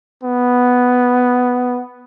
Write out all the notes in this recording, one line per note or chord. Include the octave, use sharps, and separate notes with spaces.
B3